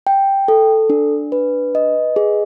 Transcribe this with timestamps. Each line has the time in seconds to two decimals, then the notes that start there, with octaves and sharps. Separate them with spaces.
0.07 G5
0.48 A4
0.90 D4
1.32 B4
1.75 D#5
2.16 G#4